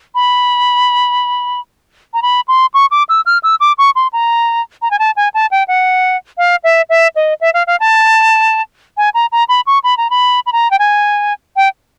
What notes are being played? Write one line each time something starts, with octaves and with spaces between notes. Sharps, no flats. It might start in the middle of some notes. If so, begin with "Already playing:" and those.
B5
A#5
B5
C6
C#6
D6
E6
F6
E6
D6
C#6
C6
A#5
A#5
G#5
A5
G#5
A5
G5
F#5
F5
E5
E5
D#5
E5
F5
F5
A5
G#5
A#5
A#5
B5
C#6
B5
A#5
B5
B5
A#5
G5
G#5
G5